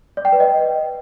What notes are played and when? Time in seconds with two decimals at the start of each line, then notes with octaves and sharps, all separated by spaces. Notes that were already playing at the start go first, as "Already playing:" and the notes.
0.17 D5
0.25 G5
0.33 B4
0.40 D#5